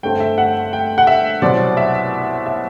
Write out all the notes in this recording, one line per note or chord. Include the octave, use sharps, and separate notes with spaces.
G1 G2 D3 A3 C4 G5
E5
F#5
G5
F#5
E5
C2 B2 F#3 C4 D5
E5
E5